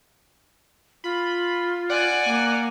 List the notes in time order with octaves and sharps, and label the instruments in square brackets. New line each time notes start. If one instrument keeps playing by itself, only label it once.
[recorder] F4 [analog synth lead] B5
[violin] D5 G#5 [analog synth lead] F#5
[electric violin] A#3